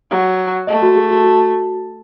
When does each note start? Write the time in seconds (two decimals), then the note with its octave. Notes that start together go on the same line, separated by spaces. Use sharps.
0.11 F#3
0.67 A3 D#5
0.82 F#4
0.96 G#4
1.11 F#4
1.24 F#4